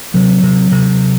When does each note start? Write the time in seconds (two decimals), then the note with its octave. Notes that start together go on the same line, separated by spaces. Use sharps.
0.14 C3 F#3
0.43 C3
0.72 C3